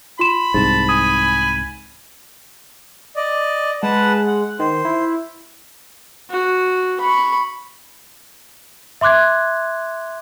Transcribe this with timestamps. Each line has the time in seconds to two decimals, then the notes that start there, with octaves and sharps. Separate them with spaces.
0.19 F4 B5 C6 E7
0.54 C2 G#2 A5
0.89 G#5 D#6
3.16 D5 D#5
3.83 G#3 B4 F#5 A5
4.27 F#5
4.59 D#3 C5
4.85 E4
6.30 F#4
7.01 B5 C#6
9.01 E5 C6 D6 F#6 G#6